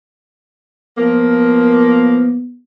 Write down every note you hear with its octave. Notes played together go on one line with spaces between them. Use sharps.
F3 A#3 B3